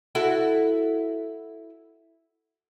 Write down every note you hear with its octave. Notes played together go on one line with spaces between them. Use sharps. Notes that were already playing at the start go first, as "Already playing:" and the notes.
E4 F#4 A4